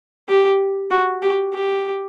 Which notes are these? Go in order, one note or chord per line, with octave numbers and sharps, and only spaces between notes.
G4
F#4
G4
G4